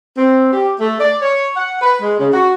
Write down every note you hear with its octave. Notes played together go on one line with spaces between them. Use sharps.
C4
G4
A3
D5
C#5
F#5
B4
G#3
C#3
F#4